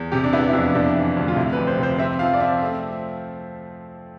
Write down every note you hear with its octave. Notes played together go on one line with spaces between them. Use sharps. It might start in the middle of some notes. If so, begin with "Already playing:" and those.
Already playing: E2
C3 G4
D4
B3 E4
E4
F2 D4
C3 D4
E3
D2
F4
C3 E4
B4
F2
C5
C3
C5
C4 E5
F3 F5
D5
C4 E5
A3